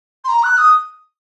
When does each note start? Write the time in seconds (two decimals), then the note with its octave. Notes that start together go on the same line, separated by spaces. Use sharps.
0.24 C6
0.28 A#5
0.43 F#6
0.58 D#6